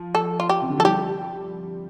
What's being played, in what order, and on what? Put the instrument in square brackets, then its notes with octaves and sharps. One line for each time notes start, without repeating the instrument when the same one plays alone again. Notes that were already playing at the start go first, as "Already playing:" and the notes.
Already playing: [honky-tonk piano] F3
[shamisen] A4
F4
G4
[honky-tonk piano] C3
D3
[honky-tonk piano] F3 [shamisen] A4
[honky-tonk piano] G3 [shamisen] G4